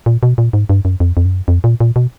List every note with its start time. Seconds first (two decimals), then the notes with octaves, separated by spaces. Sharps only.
0.06 A#2
0.23 B2
0.38 A#2
0.53 G#2
0.69 G2
0.85 F#2
1.00 F2
1.17 F2
1.25 F#2
1.48 F2
1.64 A#2
1.80 A#2
1.96 B2